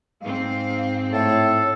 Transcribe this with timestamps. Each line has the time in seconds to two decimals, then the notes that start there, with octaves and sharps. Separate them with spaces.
0.21 G#2 C4 F5
1.13 A2 A4 C#5